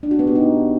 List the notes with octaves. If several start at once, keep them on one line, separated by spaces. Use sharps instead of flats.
D4
F#4
B3
G4
D#4